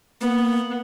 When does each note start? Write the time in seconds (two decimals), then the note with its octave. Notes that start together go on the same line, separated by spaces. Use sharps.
0.21 A#3 B3